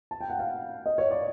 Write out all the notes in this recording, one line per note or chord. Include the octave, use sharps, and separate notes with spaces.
A5
G5
F#5
F5
D#5
C#5
D5